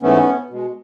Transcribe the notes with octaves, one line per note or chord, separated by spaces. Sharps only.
G#2 E3 A3 B3 C#4
B2 G#3